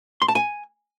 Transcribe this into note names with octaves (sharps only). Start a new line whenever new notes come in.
C6
A5
G#5